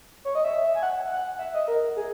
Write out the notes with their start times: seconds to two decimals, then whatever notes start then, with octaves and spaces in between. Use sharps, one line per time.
0.25 C#5
0.35 D#5
0.44 E5
0.75 G#5
0.83 F#5
1.11 F#5
1.39 E5
1.54 D#5
1.68 A#4
1.96 G#4